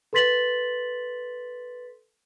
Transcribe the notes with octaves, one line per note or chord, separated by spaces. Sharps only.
A4 B4 C6 A6 B6 F#7